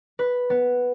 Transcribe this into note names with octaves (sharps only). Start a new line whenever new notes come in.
B4
B3